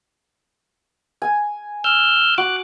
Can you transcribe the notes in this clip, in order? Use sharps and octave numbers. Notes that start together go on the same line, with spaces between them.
G#5
E6 F6 G6
F#4 D6 F#6